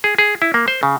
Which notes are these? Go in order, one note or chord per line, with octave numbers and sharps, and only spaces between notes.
G#4
G#4
E4
A#3
C5
C#3